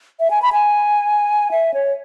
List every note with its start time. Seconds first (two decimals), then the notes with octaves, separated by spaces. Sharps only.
0.20 E5
0.31 G#5
0.42 B5
0.53 G#5
1.51 E5
1.74 C#5